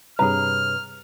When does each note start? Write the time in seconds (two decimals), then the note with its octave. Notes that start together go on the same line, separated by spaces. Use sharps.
0.19 G2 C3 G#4 B4 C#5 A#5 F6